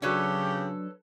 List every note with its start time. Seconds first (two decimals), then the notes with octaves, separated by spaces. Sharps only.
0.02 C#3 F#3 D4 G4 A4 B4 C#5